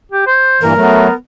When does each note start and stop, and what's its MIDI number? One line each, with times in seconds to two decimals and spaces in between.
0.11 0.26 67
0.27 0.61 72
0.61 0.73 43
0.61 0.73 46
0.61 0.73 52
0.61 1.13 70
0.76 1.08 54
0.76 1.08 57
0.76 1.15 59